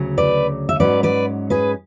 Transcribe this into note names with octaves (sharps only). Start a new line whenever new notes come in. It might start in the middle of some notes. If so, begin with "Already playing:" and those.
Already playing: D2 C#3 F#3
B4 D5
E5
G#2 F#3 C#4 B4 D5
B4 D5
G#4 B4